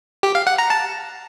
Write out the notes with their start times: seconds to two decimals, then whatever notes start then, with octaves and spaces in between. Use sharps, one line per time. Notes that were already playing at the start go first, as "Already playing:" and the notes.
0.23 G4
0.35 F5
0.47 F#5
0.58 A#5
0.70 A5